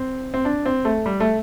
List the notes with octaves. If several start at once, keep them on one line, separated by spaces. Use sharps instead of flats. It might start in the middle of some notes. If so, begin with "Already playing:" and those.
Already playing: C4
C4
D4
C4
A3
G3
A3